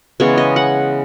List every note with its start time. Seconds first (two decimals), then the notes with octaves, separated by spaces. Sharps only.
0.20 C#3 E3 G#3 B3 C#5
0.38 D#5
0.56 F#5